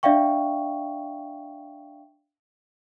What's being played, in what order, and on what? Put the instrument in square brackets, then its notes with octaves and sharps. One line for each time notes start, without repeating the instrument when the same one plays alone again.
[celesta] D4 D5 E5 F5 G5 C#6